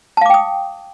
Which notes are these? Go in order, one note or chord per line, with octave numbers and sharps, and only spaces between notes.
F5 G5 A5 D6 D#6